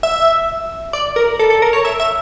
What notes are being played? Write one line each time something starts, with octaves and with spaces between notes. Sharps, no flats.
E5
D5
A#4
A4
A4
A#4
C#5
E5
E5